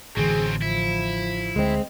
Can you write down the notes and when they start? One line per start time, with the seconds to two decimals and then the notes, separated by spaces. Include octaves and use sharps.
0.17 A1 D3 E3 F#3 C4 G#4
0.62 F3 E4
1.56 D2 G#3 C4